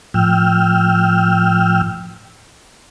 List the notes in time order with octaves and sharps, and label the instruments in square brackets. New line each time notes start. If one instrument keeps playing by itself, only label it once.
[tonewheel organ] A2 F3 G5 E6 F6